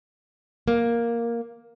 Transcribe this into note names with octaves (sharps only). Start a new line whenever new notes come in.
A#3